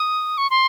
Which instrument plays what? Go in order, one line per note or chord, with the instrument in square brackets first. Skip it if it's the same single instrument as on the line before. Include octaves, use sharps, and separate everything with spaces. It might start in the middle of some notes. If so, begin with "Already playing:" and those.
Already playing: [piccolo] D#6
C#6
C6